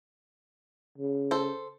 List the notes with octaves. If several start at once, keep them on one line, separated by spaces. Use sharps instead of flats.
C#3
A4 C5